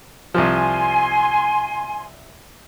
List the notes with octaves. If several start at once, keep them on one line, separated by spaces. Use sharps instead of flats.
C2 F3 G#5 C6